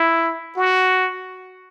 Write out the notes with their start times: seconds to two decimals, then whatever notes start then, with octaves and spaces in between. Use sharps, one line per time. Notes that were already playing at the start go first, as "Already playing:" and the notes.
Already playing: E4
0.57 F#4